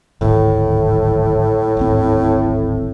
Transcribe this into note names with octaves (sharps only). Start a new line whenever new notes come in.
D1 G#1 A2
D1 G#1 C4